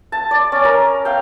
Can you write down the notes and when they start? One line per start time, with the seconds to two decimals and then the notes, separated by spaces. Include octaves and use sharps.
0.12 A5
0.31 D5
0.52 C#4
0.65 A#4
1.05 F5 G5